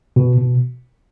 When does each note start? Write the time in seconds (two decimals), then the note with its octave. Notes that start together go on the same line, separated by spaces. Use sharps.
0.16 B2
0.38 B2